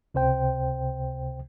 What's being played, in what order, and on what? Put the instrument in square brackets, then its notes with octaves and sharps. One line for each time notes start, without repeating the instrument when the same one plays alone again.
[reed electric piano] C#2 C3 C5 G5